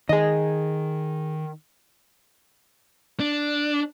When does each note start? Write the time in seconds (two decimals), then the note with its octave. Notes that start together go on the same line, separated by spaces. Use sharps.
0.09 D#3 G#4 D#5
3.20 D4